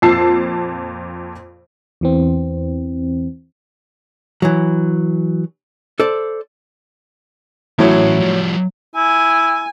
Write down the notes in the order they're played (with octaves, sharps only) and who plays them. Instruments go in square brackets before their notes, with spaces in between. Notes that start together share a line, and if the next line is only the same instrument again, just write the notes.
[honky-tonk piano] F2 A#2 A5 E6 C7
[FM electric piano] E2 E3 C4
[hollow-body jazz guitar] E3 F#3
A4 C5 D5
[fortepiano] A2 F#3 [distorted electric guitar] E3 C#4
[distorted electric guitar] F3 G3
[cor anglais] E4 [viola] G#5